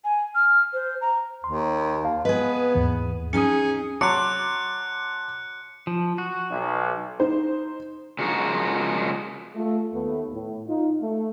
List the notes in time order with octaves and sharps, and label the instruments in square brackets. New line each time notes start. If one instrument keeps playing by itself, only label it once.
[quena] G#5
F6
C5
A#5
[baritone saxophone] D#2 [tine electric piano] C6
[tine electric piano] F5 A5
[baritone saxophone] B3 [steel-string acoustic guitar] G#4 B4 [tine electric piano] D#5
[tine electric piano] D#2 G#2 E3
[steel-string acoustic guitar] C#4 D#4 G#5 [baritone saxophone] G#4 [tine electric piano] D#6 C#7
[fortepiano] F#3 [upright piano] A5 C6 D6 [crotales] F#6 C#7
[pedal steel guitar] F3
F#4
[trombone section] B1
[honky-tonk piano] D#4 C5
[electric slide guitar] C#3 F3 G#3 F#4 A#4
[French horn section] A3 F4
D#2 A3 B3
A2
D#4 F4
A3